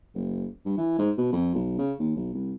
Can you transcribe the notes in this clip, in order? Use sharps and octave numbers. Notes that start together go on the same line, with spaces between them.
F#1
G2
E3
G#2
B2
F2
B1
C#3
D#2
B1
C2